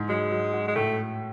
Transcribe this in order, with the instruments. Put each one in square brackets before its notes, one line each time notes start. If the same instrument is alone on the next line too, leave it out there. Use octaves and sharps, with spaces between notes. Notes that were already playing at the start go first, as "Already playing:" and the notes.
Already playing: [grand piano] G#2 E4
[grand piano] F#3 [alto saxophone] G#3
[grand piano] F#3
F#4
[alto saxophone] G#3
[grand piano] A2 [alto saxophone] A3